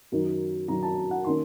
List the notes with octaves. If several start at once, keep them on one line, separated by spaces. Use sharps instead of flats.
F#2 D#3 F#3
F#2 D#3 F#3 A#5
A5
F#5
D#3 A#3 C#4 C6